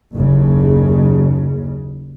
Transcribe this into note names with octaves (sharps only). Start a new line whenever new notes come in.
F#1 D#2 C#3